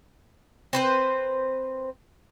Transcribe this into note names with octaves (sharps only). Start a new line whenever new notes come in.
C4 B4 C5